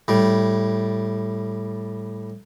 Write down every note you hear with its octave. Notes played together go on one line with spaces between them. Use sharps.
A2 G3